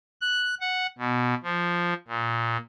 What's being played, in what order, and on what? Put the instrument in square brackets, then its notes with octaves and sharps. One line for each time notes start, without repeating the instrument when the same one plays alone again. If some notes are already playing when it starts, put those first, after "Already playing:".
[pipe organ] F#6
F#5
B2
F3
A#2